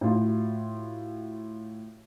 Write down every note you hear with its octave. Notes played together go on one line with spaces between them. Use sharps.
A2 F4 F#4